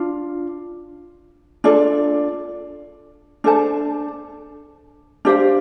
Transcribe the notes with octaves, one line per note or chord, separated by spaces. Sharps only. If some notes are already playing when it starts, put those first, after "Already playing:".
Already playing: D4 F4
D4 F4 A4 D5
D4 A4 C5 A5
D4 G4 C5 F5